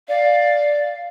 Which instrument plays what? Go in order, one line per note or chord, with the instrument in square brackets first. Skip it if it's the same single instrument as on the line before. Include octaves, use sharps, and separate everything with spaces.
[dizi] D5 [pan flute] F5